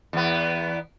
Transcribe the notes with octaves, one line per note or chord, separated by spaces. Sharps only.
E2 B3